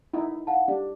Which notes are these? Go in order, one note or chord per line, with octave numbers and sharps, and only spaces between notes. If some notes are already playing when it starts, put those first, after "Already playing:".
D#4 E4
F5 F#5 A5
D4 G4